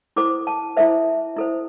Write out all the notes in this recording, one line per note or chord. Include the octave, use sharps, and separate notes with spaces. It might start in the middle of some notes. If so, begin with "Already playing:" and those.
E4 A4 C5 D6
A5
E4 A4 C5 E5
E4 A4 C5